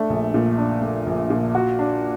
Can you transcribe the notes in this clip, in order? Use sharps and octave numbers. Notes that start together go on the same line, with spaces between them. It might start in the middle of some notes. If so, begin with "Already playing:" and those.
Already playing: A3 D4
A#1
A#2
D4
A3
A#1
A#2
F#4
D4